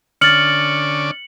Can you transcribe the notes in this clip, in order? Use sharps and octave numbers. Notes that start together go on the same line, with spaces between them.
D3 C#4 D5 F6 A6 C#7 F#7